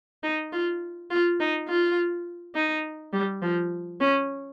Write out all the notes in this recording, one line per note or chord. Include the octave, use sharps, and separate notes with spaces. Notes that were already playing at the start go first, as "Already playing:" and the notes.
D#4
F4
F4
D#4
F4
D#4
G3
F3
C#4